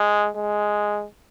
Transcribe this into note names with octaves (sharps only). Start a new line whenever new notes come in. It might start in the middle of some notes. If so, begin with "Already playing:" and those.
Already playing: G#3
G#3